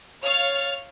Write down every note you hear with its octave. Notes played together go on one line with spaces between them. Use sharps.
C#5 F5 F6 A6